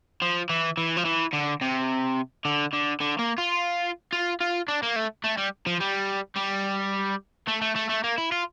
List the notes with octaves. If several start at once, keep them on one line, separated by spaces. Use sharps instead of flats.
F3
E3
E3
F3
E3
D3
C3
D3
D3
D3
A#3
F4
F4
F4
D4
A#3
A3
A3
G3
F3
G3
G3
A3
A3
A3
A3
A#3
E4
F4